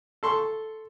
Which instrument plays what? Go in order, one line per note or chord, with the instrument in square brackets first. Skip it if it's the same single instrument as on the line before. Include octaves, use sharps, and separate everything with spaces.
[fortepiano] A4 C6 C#6